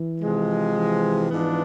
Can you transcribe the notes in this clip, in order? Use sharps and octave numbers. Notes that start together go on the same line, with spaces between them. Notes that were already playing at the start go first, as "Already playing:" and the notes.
Already playing: E3
C3 F3 G#3
E3
G#2 F3 G#3 B3 D4